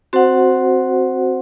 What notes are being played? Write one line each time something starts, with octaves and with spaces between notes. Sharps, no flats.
C4 F#4 C5 F#5